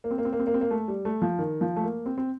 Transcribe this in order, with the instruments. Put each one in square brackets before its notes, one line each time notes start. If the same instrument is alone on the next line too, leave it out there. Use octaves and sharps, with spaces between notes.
[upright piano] A#3
C4
A#3
C4
A#3
C4
A#3
C4
A#3
A3
G3
A3
F3
D#3
F3
A3
A#3
C4
C4